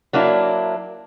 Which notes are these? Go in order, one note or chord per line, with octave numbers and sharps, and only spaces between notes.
F#3 A#3 D4 E4